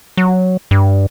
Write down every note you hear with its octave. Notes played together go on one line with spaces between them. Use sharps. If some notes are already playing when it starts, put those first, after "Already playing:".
F#3
G2